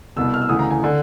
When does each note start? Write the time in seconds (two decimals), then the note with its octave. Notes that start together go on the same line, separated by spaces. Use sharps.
0.16 C2 B2 E6
0.34 F6
0.42 E6
0.49 D2 C#3 E3 D#6
0.59 A#5
0.71 G#5
0.84 D3